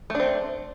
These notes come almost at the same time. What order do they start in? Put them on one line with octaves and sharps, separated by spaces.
A3 D4 C4